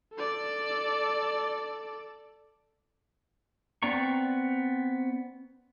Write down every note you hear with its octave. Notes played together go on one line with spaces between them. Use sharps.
A4 D5
B3 C4 D5 A#5 C#6